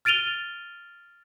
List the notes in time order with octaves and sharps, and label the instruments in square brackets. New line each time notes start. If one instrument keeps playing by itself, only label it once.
[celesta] F6 A6 D7 D#7 F7 G7